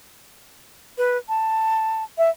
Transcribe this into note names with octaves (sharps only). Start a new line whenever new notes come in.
B4
A5
E5